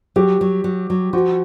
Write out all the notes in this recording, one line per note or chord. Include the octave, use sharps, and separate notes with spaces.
F#3 G4
F#3
F#3
F#3
F3 F#4